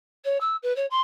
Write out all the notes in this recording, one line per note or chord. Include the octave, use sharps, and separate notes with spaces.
C#5
E6
B4
C#5
C6